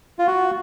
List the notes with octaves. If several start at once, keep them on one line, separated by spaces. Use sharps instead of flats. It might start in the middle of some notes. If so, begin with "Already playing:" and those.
F4
F#4